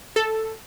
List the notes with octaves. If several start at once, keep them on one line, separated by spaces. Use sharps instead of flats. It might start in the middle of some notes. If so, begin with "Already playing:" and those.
A4